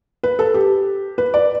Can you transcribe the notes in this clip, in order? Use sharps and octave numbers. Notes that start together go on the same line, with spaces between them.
B4
A4
G4
B4
D5